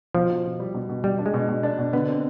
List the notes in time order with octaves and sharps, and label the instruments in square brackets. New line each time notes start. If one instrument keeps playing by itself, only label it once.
[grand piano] B2 [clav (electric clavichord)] F3
[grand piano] B2
B2
G3
B2
B2
[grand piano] B2 [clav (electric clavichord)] G3
[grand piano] D4
[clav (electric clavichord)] G#3
[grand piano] B2
B2
D4
B2
[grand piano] D3 [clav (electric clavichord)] B3
[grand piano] C4